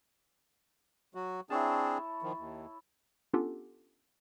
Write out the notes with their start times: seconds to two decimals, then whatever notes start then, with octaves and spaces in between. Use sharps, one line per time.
1.15 F#3 F#4
1.50 C4 D4 E4 G#4 C#5 A5
2.22 D#3 F3
2.38 D#2
3.33 B3 C#4 D4 F4 G4 A4